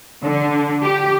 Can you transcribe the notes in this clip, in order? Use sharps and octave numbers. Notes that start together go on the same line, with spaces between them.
D3
G4